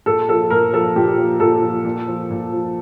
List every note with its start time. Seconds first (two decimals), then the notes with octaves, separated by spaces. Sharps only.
0.06 A#2 A4
0.29 F3 A4
0.50 A#2 A#4
0.73 F3 A4
0.96 A#2 G4
1.18 F3
1.40 A#2 A4
1.62 F3
1.84 A#2
2.07 F3
2.30 A#2
2.52 F3